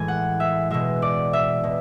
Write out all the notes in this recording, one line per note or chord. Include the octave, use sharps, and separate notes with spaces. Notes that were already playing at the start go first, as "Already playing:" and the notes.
Already playing: A2 E3 G#3 G#5
F#5
E5
B2 G#3 E5
D5
E5
B2